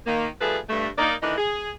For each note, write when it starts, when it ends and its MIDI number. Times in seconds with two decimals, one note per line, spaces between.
0.07 0.28 51
0.07 0.28 58
0.41 0.58 53
0.41 0.58 55
0.41 0.58 57
0.41 0.58 68
0.41 0.58 69
0.41 0.58 71
0.69 0.88 43
0.69 0.88 57
0.98 1.14 58
0.98 1.14 63
0.98 1.14 74
1.22 1.37 51
1.22 1.37 52
1.22 1.37 57
1.22 1.37 62
1.22 1.37 63
1.37 1.70 68